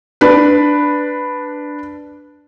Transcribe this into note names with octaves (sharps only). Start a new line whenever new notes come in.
D4 B4